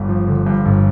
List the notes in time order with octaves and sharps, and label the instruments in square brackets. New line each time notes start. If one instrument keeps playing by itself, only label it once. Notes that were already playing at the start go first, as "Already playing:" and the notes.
Already playing: [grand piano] G1 G2 D3
F3
D3
G2
G1